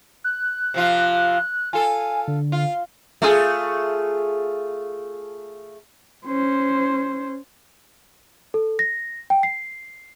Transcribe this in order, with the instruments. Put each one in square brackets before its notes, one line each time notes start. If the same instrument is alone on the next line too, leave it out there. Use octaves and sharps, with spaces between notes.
[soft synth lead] F#6
[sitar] C3 F3 F4
[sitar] F4 A4 [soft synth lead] G#5
[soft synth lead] D3
[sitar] F4
A3 F4 G#4
[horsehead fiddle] C#4 C5
[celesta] A4
A#6
G5
C7